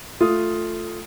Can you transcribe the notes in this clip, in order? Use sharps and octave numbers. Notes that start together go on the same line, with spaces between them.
A3 F4 D#6